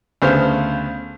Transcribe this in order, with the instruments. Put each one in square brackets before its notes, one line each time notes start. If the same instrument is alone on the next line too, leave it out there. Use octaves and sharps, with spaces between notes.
[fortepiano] D2 C#3 B3 C5 F5 F6